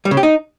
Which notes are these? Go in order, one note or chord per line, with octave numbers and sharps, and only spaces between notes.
G3
C#3
G4
D#4